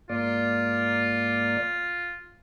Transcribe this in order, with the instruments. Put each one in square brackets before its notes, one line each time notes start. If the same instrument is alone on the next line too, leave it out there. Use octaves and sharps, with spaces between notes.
[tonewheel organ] G#2 A#3 D5 [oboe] F4